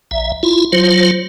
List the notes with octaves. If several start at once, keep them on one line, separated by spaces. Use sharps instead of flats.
A#1 E5
E4 F4
F#3 F4 C5